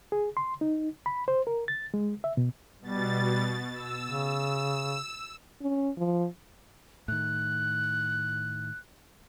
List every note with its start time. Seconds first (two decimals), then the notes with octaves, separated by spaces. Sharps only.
0.12 G#4
0.37 C6
0.61 D#4
1.06 B5
1.28 C5
1.47 A#4
1.68 A6
1.94 G#3
2.24 E5
2.37 B2
2.82 B2 G3 A6
3.73 E6
4.06 C#3
5.61 C#4
5.98 F3
7.08 A2 D#3 F#6